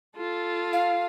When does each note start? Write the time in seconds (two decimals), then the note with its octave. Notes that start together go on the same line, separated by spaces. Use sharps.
0.16 F4 A4
0.73 F5